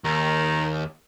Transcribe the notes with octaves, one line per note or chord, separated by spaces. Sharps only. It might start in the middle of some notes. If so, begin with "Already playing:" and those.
D#2 D#3